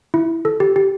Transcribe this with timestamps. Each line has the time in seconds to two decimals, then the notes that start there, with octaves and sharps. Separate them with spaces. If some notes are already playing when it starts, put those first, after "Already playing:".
0.14 E4
0.45 A4
0.60 G4
0.76 G4